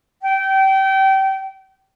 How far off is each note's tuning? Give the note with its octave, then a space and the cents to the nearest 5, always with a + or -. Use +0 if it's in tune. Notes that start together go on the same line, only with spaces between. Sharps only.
G5 -25